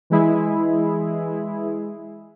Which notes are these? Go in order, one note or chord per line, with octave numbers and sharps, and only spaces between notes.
E3 G#3 E4 G#4